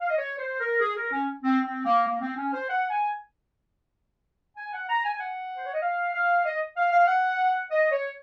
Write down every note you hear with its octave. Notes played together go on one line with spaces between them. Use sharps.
F5
D#5
C#5
C5
A#4
G#4
A#4
C#4
C4
C4
A#3
A#3
C4
C#4
C5
F#5
G#5
G#5
F#5
A#5
G#5
G#5
F#5
C5
C#5
D#5
F5
F5
D#5
F5
F5
F#5
D#5
C#5